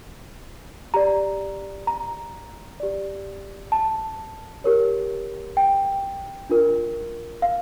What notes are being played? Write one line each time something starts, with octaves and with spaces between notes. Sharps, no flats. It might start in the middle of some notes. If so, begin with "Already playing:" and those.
G4 D5 A#5
A#5
G4 D5
A5
G4 A#4 C#5
G5
D4 F4 A#4
F5